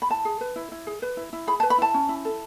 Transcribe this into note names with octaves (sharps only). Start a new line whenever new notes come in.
B5
E4 A5
G#4
B4
E4
E4
G#4
B4
E4
E4
G#4 B5
A5
B4
B5
E4 A5
C#4
E4
A4